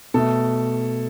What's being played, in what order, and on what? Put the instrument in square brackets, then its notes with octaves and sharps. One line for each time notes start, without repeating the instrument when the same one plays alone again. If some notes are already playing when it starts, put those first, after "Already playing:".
[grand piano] B2 A3 A4